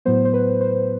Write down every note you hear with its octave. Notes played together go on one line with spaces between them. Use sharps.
A2 F#3 B3 C5
C5
B4
C5